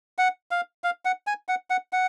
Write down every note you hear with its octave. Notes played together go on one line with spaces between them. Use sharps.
F#5
F5
F5
F#5
G#5
F#5
F#5
F#5